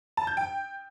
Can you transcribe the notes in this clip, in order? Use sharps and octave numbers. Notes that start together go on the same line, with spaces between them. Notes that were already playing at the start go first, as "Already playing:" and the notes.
A5
G6
G5